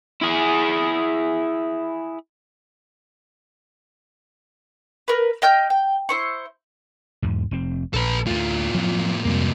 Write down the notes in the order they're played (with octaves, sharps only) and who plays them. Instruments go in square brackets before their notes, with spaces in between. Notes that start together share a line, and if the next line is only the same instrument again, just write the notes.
[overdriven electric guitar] E4 G#4
[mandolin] A#4 B4
D#5 G5 F6 G6
G5
E4 C5 C#6
[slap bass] E2 G#2
F1 C4
[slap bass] A#1 [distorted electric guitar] A4 B4
[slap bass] D2 A3 [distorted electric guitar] A2 F4
[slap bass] F3 F#3 C4
[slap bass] F2 G3 G#3 [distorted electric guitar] C3 A#3